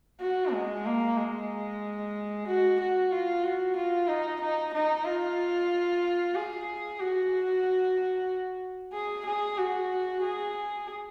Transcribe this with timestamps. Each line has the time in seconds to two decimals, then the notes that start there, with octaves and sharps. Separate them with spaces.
0.21 F#4
0.52 G#3
0.86 A#3
1.17 G#3
2.48 F#4
2.80 F#4
3.12 F4
3.44 F#4
3.76 F4
4.08 D#4
4.41 D#4
4.74 D#4
5.05 F4
6.35 G#4
6.99 F#4
8.93 G#4
9.26 G#4
9.58 F#4
10.22 G#4